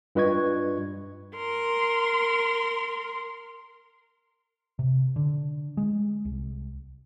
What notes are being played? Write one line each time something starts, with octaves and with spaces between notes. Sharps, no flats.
G2 F4 B4 D#5 C#6 G#6
A#4 C6
C3
D3
G#3
C2